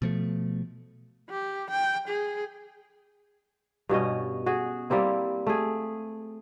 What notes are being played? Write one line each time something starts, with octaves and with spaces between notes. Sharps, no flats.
B2 F3 A3
G4
G5
G#4
G2 B2 C#4 D#5
F#4 G#4
G3 A#3 C4 E4
A3 G#4